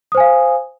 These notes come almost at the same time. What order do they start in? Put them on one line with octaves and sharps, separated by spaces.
D#6 C5 G#5 F5